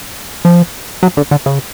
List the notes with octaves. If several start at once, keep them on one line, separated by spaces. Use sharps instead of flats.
F3
F#3
D3
D3
C#3